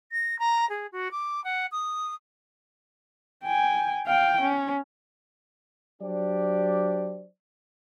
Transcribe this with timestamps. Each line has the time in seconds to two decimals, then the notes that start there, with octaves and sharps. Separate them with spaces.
0.12 A#6
0.39 A#5
0.69 G#4
0.92 F#4
1.11 D6
1.44 F#5
1.72 D#6
3.43 G5 G#5
4.07 F5 G5
4.42 C#4
6.02 F#3 D4 G4 C5 D5